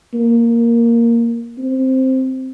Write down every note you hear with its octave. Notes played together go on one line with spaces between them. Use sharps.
A#3
C4